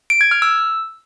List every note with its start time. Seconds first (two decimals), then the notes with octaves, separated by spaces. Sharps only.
0.10 D7
0.21 G#6
0.31 F6
0.42 E6